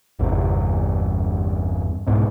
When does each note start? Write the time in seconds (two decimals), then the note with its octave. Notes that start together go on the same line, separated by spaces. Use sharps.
0.19 G1 E2 G2 C3
2.07 C2 G#2 B2